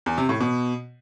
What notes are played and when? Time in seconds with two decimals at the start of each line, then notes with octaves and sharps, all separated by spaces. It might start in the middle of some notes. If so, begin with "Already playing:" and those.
0.06 E2
0.18 C3
0.29 A2
0.40 B2